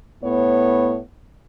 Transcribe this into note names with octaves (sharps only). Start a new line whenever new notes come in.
A2 B3 C#5